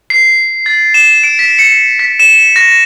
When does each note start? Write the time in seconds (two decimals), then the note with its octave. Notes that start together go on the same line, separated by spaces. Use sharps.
0.10 C7
0.66 A6
0.94 E7
1.24 D7
1.39 B6
1.59 C#7
1.99 B6
2.20 E7
2.56 A#6